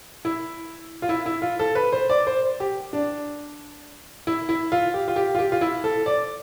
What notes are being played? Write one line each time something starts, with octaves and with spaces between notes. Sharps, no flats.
E4
F4
E4
E4
F4
A4
B4
C5
D5
C5
G4
D4
E4
E4
F4
G4
F4
G4
F4
G4
F4
E4
A4
D5